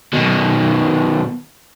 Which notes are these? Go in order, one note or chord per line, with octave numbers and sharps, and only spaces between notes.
B2 D#3